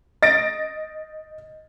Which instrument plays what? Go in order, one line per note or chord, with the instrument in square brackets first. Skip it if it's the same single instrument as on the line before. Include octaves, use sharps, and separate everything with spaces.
[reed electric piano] D#5 [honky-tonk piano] A6 A#6 D7